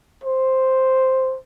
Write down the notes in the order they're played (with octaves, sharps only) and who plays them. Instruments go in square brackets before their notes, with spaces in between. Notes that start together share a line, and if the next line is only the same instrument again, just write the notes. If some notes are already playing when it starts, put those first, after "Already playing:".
[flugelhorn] C5